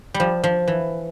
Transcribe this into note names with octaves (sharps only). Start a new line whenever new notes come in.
G3
F3
F3
E3